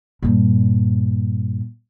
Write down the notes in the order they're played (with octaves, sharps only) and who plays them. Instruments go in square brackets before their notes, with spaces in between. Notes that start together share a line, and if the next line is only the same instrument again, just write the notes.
[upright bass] G2 A#2